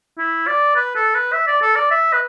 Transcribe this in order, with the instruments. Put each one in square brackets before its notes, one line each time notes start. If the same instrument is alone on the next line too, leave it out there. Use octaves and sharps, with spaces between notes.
[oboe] E4
D5
B4
A4
B4
E5
D5
A4
D5
E5
B4